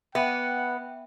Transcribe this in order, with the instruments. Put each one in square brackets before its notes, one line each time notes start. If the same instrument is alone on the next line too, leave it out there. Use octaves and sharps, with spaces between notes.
[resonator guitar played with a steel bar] B3 [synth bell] E5 G5 [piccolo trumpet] F#5